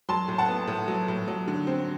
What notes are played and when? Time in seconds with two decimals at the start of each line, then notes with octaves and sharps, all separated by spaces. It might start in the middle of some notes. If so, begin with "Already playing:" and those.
0.09 F#3 A5 C6
0.28 A2
0.38 F#5 A5
0.48 B3
0.67 A2
0.88 F#3
1.08 A2
1.28 F#3
1.48 D3
1.67 C4